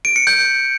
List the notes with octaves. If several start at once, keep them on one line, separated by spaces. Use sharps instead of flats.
D7
C#7
G6